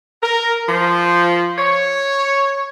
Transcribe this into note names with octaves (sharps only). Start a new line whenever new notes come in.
A#4
F3
C#5